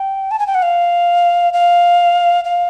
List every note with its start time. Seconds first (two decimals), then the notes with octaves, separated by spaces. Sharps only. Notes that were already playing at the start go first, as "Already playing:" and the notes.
Already playing: G5
0.31 A5
0.39 G#5
0.47 G5
0.55 F#5
0.62 F5
1.53 F5
2.45 F5